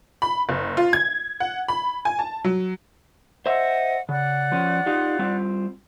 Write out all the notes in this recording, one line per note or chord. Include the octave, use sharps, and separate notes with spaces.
B5
F#1
F4
G#6
F#5
B5
G#5
A5
F#3
C5 D#5 E5 F#5
C#3 D5 F#5 F#6
F3 C#4
D#4 F4 G4
G3 C4 F4